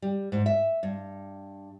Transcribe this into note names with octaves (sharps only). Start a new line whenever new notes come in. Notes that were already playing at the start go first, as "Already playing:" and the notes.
G3
G#2
E5
G2